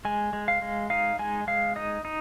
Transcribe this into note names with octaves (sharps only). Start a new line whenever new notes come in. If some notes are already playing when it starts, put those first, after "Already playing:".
G#3 G#5
G#3
F5
G#3
D#4 F5
G#3 G#5
G#3 F5
D#4 D#5
D#4